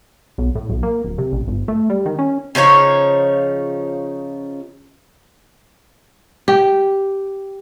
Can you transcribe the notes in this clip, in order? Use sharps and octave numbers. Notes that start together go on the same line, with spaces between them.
B1
A2
B1
A#3
D1
C3
A1
G1
A3
G3
D#3
C#4
C#3 F3 D#4 C#5
G4